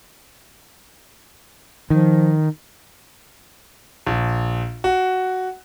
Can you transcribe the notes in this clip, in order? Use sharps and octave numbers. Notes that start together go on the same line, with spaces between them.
D#3 F3
A#1
F#4